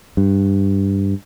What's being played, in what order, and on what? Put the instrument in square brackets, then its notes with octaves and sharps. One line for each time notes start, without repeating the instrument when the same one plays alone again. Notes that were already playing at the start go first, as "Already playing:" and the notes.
[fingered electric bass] G2